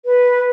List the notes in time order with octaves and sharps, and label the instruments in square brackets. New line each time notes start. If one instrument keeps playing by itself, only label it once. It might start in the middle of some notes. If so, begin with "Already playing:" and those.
[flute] B4